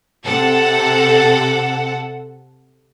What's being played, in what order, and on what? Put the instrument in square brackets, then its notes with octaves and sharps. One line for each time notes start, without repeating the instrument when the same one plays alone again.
[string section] C3 A4 F#5